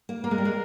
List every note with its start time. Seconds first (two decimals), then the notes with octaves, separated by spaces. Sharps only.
0.09 A#3
0.24 A#3 A#4
0.31 G#3
0.38 G3
0.45 G#3